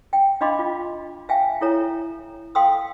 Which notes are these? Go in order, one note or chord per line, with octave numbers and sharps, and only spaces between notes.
G5
D4 D#5 F5 B5 C6 D6
F4
E5 F5 G5 G#5
E4 A4 C#5 A#5
A4 F5 G5 C6 D#6 E6